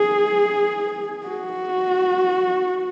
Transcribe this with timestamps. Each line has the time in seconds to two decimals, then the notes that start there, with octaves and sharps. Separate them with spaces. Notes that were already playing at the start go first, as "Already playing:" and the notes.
Already playing: G#4
1.27 F#4